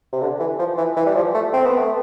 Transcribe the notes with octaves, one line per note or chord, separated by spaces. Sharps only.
C3
D3
E3
F3
E3
E3
G3
F3
A3
C4
B3
A3